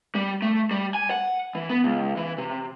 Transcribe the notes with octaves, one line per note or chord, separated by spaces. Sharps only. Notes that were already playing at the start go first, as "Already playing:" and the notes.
G3
A3
G3
G#5
F#5
E3
B3
C#2
E3
C3